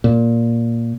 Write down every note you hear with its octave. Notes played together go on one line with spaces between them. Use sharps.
A#2